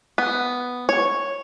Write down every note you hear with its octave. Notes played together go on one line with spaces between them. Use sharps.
B3
C#5